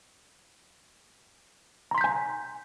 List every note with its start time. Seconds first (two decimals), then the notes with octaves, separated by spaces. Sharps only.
1.91 A#5
1.95 C6
1.98 B6
2.01 G6
2.04 G#5